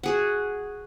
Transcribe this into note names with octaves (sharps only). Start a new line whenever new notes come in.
F#4 G#4 F#5